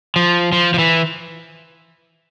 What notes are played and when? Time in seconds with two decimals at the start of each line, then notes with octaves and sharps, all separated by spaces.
0.16 F3
0.52 F3
0.74 F3
0.79 E3